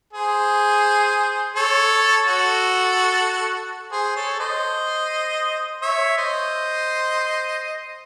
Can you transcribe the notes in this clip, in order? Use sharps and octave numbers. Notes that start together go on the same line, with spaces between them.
G#4 C5
A4 C#5
F#4 A4
G#4 C5
A4 C#5
C5 D#5
C#5 E5
C5 D#5